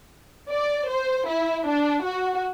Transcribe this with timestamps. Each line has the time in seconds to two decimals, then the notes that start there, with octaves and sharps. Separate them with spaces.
0.50 D5
0.88 C5
1.28 E4
1.66 D4
2.04 F#4